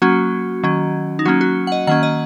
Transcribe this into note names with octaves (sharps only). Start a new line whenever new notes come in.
F#3 A#3 C#4 F#4
D#3 F#3 C#4
D#4
F#3 A#3 C#4 F#4
F#4
F#5
D#5
D#3 A#3 C#4 F#5
D#5